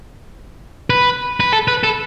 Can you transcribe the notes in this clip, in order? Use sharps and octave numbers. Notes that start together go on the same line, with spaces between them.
B4
B4
A4
B4
A4